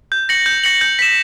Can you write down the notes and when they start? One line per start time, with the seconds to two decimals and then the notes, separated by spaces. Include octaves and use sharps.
0.12 G6
0.29 A#6 C#7 F#7
0.46 G6
0.64 A#6 C#7 F#7
0.81 G6
0.99 B6 E7